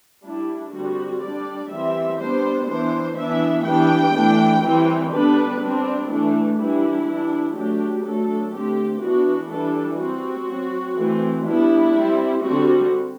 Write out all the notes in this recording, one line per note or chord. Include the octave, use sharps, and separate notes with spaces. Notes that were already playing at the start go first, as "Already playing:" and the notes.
G3 D4 E4
D3 G3 C4 F#4
G3 D4 D5
E3 G3 C4 E5
G3 B3 D4 C5
E3 B3 D4 C5
E3 B3 D4 E5
E3 G3 B3 D4 G5
E3 A3 D4
E3 G3 C4
D3 G3 B3 D4 B4
G3 C4 D4
E3 A3 D4
E3 G3 D4 E4
E3 G3 D4
F#3 A3 D4 G4
F#3 A3 D4 A4
D3 A3 C4 G4
E3 B3 D4 F#4
E3 G3 D4 A4
G3 C4 F#4
F#3 C4
E3 A3 C4
G3 B3 D4 E4
G3 C4
D3 G3 C4 F#4